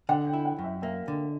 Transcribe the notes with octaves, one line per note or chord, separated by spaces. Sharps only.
D3 F#5
G5
E4
F#5
F#2
E5
A#3 E5
D3